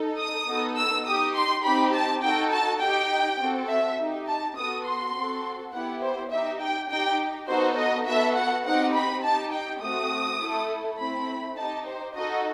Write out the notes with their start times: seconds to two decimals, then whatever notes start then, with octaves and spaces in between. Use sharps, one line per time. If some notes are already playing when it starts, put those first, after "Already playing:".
Already playing: D#4 A4
0.18 D#6
0.47 B3 D#4 F#4 A4
0.77 E6
1.06 D#4 G4 D#6
1.35 C6
1.64 C4 D#4 G4 B5
1.94 A5
2.23 D#4 F#4 A4 G5
2.52 A5
2.81 D#4 G4 G5
3.40 C4 F#4 A4
3.69 E5
3.99 D#4 G4
4.28 A5
4.57 B3 F#4 A4 D#6
4.85 C6
5.14 C4 F#4 A4
5.73 B3 E4 G4 F#5
6.02 C5
6.31 D#4 G4 E5
6.61 G5
6.90 D#4 G4 G5
7.48 B3 D#4 F#4 A4 C5
7.77 D#5
8.07 B3 F#4 A4 E5
8.36 F#5
8.65 C4 D#4 G4 F#5
8.95 B5
9.24 D#4 G4 A5
9.52 G5
9.82 A3 C4 F#4 D#6
10.40 A3 E4 A4
10.99 A3 C4 E4 B5
11.56 D#4 G4 A5
11.86 C5
12.15 D#4 F#4 A4 D#5